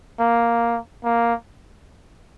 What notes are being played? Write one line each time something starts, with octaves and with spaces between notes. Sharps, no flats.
A#3
A#3